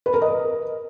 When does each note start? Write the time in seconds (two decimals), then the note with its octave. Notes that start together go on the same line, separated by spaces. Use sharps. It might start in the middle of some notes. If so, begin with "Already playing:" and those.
0.06 B4
0.14 A#4
0.22 D#5